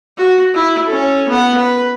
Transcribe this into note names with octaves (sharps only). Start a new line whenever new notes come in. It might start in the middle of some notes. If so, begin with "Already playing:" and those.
F#4
E4
C#4 A4
B3 F#5
B4